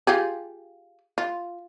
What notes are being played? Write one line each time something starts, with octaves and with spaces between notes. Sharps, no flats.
F4 G4 G#4
F4